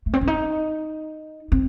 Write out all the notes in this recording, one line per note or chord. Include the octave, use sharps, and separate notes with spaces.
A3
C4
C#4
D#4
C4